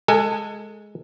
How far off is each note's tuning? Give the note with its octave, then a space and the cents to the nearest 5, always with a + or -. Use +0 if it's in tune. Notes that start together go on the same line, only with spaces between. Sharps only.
G#3 +10 A4 +25 G#5 +0